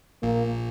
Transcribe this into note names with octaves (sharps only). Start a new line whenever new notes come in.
A#1 A#2 A#3